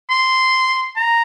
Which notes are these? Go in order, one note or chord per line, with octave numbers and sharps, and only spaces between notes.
C6
A#5